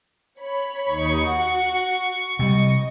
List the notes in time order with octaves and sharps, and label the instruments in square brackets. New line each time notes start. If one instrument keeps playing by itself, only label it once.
[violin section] C#5 B5
[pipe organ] D#2 D#4 C#6
[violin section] F#4 F#5 [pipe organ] C#6
[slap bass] C3 G3 [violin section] D#5